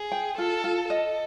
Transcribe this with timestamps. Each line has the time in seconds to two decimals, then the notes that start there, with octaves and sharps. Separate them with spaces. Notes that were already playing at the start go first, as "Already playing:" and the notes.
Already playing: G#4
0.12 G5
0.38 F4 A4
0.64 F4
0.90 A4 D#5